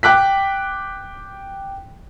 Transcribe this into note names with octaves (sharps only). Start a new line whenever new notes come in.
G5 D6 F#6 B6